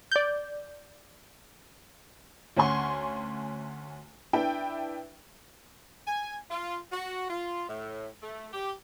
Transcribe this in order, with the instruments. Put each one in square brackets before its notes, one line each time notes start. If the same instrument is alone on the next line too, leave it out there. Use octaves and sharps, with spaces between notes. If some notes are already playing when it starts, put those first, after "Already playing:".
[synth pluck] D5 G6
[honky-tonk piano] D2 C#4 F#5 G#5 C6 C#6
D4 E4 B4 E5 G5
[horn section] G#5
F4
F#4
F4
A2
A3
G4